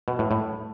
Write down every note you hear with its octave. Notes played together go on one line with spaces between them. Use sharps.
B2
A2
A2